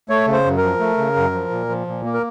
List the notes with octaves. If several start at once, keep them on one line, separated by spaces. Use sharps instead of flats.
A3 C#5
C#3
C5
F#2
A#4
F3
A3
C#3
F#2
F3
A#2
F3
A#2
A#3
A#4